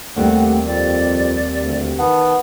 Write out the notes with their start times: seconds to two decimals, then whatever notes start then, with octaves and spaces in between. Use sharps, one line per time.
0.16 D#2 C3 G3 A3 F#5
0.67 F2 D5
1.61 D2
1.99 D#3 B3 A5